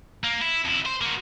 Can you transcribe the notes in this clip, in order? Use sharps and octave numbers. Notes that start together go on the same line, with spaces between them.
A#3
E4
F2 E4
C5
A#3 F#4